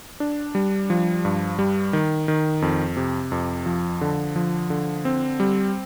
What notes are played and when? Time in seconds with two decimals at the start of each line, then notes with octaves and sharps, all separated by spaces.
0.20 D4
0.55 G3
0.90 F3
1.25 G2
1.59 G3
1.93 D#3
2.28 D#3
2.62 F2
2.97 C3
3.32 F2
3.66 F3
4.01 D3
4.36 F3
4.70 D3
5.05 C4
5.40 G3